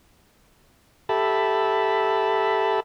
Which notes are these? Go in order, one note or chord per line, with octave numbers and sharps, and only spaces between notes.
G4 A4 E5 A5 B5